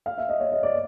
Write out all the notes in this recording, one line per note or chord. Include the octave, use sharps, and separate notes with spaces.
F5
E5
D#5
C#5
D#5
D5